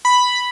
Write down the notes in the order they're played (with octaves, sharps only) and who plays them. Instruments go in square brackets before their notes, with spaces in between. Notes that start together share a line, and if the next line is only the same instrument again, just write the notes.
[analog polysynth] B5